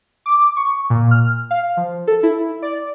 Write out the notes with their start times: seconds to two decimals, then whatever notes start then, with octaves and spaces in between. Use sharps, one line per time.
0.26 D6
0.57 C#6
0.90 A#2
1.11 F6
1.51 F5
1.77 F3
2.07 A4
2.23 E4
2.62 D5